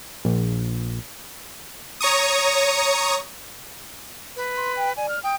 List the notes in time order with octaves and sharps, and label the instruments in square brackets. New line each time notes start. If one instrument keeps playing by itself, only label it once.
[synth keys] A#1
[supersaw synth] C#5 A#5 C#6 D#6
[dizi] B4
[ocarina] C6
G5
[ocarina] D5 [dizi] G#5
[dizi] F6
[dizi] G5 [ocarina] D#6